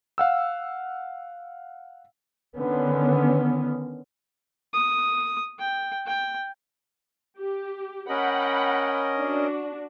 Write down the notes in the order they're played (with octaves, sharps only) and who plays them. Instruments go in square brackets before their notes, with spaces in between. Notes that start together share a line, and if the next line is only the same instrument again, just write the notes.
[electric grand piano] F5 F#5 E6
[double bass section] D3 D#3 B3 C#4
[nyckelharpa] D#6
G5
G5
[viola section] G4
[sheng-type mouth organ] C#4 A#4 D#5 [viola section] F#5 G5 B5
[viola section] D4 F#4